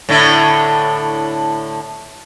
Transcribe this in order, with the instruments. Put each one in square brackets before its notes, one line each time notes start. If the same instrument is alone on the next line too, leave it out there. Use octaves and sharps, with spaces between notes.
[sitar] A2 D3 E4